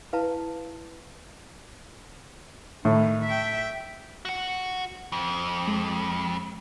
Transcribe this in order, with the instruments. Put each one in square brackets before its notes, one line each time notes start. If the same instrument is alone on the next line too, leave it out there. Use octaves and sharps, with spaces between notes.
[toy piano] E4 B4 F5 A5 A#5
[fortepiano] A2 [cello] D#3
[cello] E5 G5
[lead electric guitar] F#4 F#5
F2
[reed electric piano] G#3